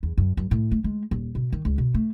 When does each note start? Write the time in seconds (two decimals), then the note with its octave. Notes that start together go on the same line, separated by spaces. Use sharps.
0.03 E2
0.18 F#2
0.37 F#2
0.51 A2
0.71 A3
0.84 G#3
1.11 D#1
1.35 B2
1.52 D#3
1.65 C#2
1.78 B2
1.94 A3